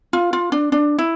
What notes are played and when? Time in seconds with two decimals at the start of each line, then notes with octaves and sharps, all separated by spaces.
0.13 F4
0.33 F4
0.52 D4
0.72 D4
0.98 E4